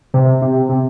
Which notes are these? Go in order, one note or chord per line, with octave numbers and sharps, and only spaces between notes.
C3
C3
C3